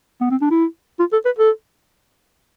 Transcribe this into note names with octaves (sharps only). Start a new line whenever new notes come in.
B3
C4
D4
E4
F4
A4
B4
A4